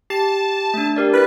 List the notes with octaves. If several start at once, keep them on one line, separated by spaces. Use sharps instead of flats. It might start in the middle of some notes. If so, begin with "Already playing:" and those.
G4 A5
A3 D4
G4 A#4 D5
E4 B4 F#6